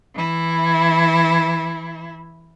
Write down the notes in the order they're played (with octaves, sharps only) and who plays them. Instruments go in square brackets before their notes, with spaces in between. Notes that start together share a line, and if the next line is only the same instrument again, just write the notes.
[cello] E3 E4